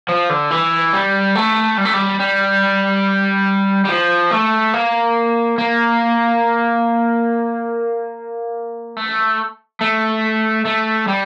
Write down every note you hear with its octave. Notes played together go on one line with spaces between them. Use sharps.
F3
D3
E3
G3
A3
G3
A3
G3
G3
G3
F3
A3
A#3
A#3
A3
A3
A3
G3